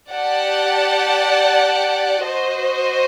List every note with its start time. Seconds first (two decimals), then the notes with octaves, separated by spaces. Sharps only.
0.11 G4 D5 F#5 A5
2.25 F#4 C5 D#5